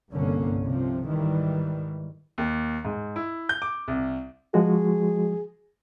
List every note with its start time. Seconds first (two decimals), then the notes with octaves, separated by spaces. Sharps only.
0.13 G1 C2 G2 D3 A#3 C#4
0.65 C3 F3
1.07 G#2 D#3 E3 G3
2.38 D#2
2.85 G#2
3.16 E4
3.49 G6
3.62 D6
3.88 C2
4.54 F3 G#3 F#4 G#4